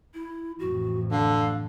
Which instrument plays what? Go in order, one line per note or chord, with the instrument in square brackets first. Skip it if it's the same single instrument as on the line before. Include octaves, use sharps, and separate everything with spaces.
[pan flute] E4
[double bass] A1 F2 [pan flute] F#4
[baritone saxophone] D3 [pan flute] F5